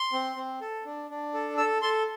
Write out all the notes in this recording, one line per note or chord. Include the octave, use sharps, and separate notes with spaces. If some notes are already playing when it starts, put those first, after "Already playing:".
Already playing: C6
C4
C4
A4
D4
D4
A4
A4 E6
A4 C6